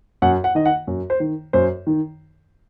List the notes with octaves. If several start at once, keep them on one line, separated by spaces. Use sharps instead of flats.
F#2 F#5
F#5
D#3 D#5
F#5
F#2
C5
D#3
F#2 C5
D#3